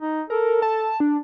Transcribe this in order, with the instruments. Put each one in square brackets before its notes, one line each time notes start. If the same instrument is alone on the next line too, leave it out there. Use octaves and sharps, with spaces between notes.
[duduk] D#4
[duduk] A4 [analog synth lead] A#4
[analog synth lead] A5
D4